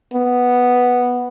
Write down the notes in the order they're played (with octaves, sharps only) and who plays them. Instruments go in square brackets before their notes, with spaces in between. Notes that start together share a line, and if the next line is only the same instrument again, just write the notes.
[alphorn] B3